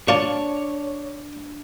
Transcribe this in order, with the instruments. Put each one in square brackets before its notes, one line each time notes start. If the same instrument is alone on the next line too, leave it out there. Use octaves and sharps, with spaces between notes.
[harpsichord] A#3 F4 A5 [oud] D4 [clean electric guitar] C#5